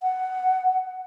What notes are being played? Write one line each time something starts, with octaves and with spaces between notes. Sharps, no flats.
F#5